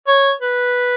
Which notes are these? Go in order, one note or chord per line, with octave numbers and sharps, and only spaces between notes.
C#5
B4